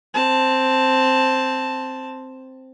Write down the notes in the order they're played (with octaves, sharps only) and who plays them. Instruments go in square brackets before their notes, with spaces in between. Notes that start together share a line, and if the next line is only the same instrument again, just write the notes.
[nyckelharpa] C4 A5